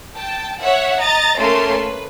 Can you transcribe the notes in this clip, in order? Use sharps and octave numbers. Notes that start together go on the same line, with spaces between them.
G5 A5
C#5 E5 F#5
D#5 A#5 A6
A3 A#3 C#4 A4 A#4 C6
B4